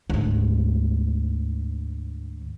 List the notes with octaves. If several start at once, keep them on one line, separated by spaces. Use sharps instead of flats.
D2 G#2